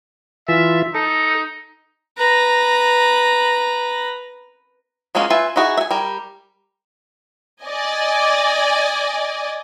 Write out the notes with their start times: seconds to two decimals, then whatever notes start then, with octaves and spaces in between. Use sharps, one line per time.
0.48 E3 F4 E5
0.95 D#4 A4
2.17 B4 A#5
5.15 F#3 G#3 A#3 C#4 F4
5.30 F4 B4 E5 G#5
5.56 D#4 E4 F#4 G#4
5.77 E5 G#5
5.91 G3 A#4
7.62 D5 D#5 G#5